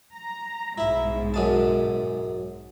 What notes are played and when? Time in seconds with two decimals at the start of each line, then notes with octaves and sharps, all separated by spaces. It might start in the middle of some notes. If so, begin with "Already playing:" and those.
0.15 A#5
0.78 B1 G#2 E4 E5
1.34 F#2 G#3 A5